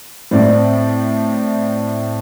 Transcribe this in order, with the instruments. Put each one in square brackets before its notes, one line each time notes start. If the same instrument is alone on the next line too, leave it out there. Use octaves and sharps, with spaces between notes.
[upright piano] A2 C4 D5